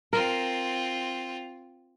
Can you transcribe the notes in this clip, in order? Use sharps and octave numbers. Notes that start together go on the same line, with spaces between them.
C4 F4 A#4